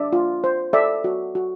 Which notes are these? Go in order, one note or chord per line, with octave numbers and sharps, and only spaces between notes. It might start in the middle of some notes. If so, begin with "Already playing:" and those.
Already playing: D4 D5 E5
F4
C5
A4 D5 E5
F#4
F#4